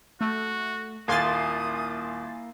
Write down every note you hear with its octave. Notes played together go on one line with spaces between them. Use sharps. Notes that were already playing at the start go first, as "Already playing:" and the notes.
A3 F#4
D#1 A#3 E4 F5 G#5 C6 D#6 A6